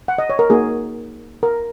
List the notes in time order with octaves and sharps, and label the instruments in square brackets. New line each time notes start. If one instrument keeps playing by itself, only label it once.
[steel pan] F#5
D#5
C#5
A#4
A#3 D#4 F#4 G#4
A#4